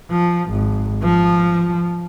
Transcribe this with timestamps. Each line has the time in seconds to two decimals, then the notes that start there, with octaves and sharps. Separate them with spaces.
0.11 F3
0.51 G#1
1.03 F3